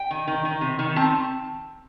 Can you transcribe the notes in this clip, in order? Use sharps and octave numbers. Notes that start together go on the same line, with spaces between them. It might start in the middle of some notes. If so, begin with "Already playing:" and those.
Already playing: G5
D#3
D#3
D#3
C3
D#3
C4 A5